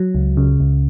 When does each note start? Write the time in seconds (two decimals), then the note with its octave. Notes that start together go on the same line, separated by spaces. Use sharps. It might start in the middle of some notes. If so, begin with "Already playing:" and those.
Already playing: F#3
0.15 C#2
0.37 C#3
0.60 C#2